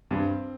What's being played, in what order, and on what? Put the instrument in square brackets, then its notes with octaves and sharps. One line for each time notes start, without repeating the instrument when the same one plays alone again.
[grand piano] G2 [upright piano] C4